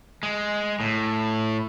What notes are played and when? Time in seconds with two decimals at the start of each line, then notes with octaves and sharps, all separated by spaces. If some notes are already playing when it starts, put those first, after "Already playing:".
0.23 G#3
0.80 A2